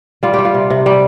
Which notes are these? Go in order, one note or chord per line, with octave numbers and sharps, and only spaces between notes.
G3 F4
G4
G3
F4
C3
C3
G3